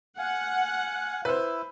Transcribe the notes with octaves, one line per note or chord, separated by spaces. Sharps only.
F5 F#5 G#5
E4 B4 C5